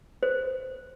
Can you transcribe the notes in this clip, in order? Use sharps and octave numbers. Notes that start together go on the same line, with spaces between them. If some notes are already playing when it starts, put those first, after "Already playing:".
C5